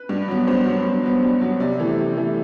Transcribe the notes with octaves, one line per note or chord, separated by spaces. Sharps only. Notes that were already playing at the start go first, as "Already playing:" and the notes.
Already playing: B4
G2
F#3 B3
G2 C5
F#3 B3
G2
F#3 B3
G2
F#3 B3
C3 D5
E3 A3
C3
E3 A3